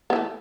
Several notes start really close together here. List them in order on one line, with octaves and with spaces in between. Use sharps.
B3 E3 A3